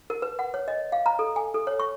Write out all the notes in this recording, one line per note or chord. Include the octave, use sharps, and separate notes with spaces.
A#4
B4
F#5
C#5
D#5
F5
A#5
A4
G#5
A4
C#5
C#6